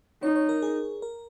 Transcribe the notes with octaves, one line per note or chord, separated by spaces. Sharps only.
D#4 C#5
C#5
A#4
G#4
A#4